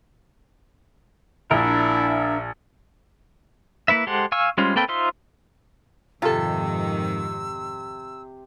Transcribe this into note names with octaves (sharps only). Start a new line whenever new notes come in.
A#1 D4 E4 A#4 E5
A#3 E4 B4 E5
G#3 G4 A4 C5 F#5
F5 G#5 C#6 E6
G3 G#3 C#4 F4 C5
A#3 C4 A4 B4 G5
D#4 F4 C5 E5 C6
F2 G#2 C3 D#3 F4 A4 E6